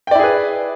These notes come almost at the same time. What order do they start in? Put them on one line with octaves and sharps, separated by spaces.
G5 D5 E4 G#4 B4